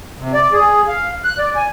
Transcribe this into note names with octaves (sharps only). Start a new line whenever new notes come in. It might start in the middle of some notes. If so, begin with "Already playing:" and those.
C3
D5
G#4
F5
F#6
D5
G#5